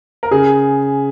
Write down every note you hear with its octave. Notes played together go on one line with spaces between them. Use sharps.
A#4
C#3 G#4